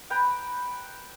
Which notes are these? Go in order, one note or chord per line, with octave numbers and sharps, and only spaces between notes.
B4 G5 A#5 B5